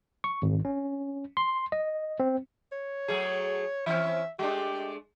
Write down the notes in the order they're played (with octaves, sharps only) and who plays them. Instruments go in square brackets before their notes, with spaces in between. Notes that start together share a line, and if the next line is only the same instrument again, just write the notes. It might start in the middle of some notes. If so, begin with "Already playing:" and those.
[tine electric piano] C#6
G#1
C#4
C6
D#5
C4
[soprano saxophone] C#5
[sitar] F#3 A3 G#4
[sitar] E3 C4 C#4 [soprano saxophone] E5
[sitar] G#3 A3 D4 [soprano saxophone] G4